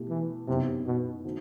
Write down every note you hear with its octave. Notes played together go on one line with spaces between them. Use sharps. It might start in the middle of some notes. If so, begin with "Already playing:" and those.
Already playing: B2 A3 E4 G4
E3
F#2 C3 E3 B3 D#4 G4
B2
D#3 A3 C4 F#4